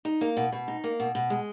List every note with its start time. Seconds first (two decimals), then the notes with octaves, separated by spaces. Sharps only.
0.05 D#4
0.21 A#3
0.37 B2
0.52 B2
0.68 D#4
0.84 A#3
1.00 B2
1.15 B2
1.30 G#3